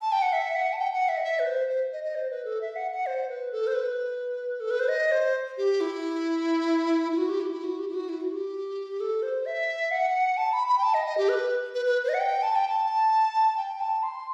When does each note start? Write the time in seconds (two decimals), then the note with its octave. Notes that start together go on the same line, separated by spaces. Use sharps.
0.01 A5
0.12 G5
0.22 F#5
0.33 E5
0.55 F#5
0.73 A5
0.79 G5
0.93 F#5
1.08 E5
1.17 D#5
1.24 E5
1.39 B4
1.46 C5
1.69 C5
1.93 D#5
2.04 D#5
2.15 C5
2.30 B4
2.45 A4
2.61 E5
2.76 F#5
2.91 F#5
3.06 C5
3.29 B4
3.52 A4
3.67 C5
3.74 B4
4.60 A4
4.70 B4
4.80 C5
4.88 D#5
5.12 C5
5.58 G4
5.80 E4
7.12 E4
7.17 F#4
7.29 G4
7.40 E4
7.51 E4
7.64 F#4
7.79 G4
7.88 E4
7.94 F#4
8.09 E4
8.21 F#4
8.32 G4
9.00 A4
9.22 C5
9.46 E5
9.91 F#5
10.37 A5
10.53 B5
10.68 B5
10.78 G5
10.83 A5
10.94 D#5
11.06 D#5
11.17 G4
11.29 B4
11.74 B4
11.86 B4
12.04 C5
12.09 D#5
12.14 F#5
12.20 G5
12.43 A5
12.56 G5
12.68 A5
13.57 G5
13.80 A5
14.03 C6